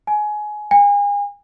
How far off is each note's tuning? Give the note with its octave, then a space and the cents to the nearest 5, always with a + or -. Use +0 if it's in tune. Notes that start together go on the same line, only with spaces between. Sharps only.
G#5 +20
G#5 -35